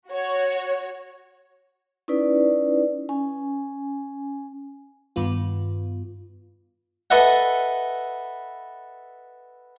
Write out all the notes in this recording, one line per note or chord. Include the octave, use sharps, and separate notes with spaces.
F#4 C#5
C#4 D#4 E4 B4 D5
C#4 G#5
G2 D#3 B3 F4
A4 B4 D#5 E5 F#5